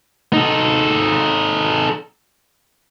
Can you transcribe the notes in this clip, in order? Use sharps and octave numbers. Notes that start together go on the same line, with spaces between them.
D#4 A4